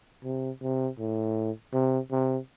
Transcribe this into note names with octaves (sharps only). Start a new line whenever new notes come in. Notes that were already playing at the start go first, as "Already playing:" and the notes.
C3
C3
A2
C3
C3